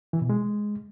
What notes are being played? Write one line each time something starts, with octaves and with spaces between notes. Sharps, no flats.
E3
B2
G#3